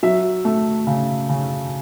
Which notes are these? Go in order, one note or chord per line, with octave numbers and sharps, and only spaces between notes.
F#3 E5
A3
C#3
C#3